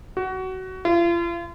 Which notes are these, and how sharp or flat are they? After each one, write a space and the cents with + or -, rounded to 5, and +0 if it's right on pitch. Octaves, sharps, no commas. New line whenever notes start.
F#4 +20
F4 -40